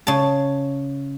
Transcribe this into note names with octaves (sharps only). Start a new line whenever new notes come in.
C#3 A5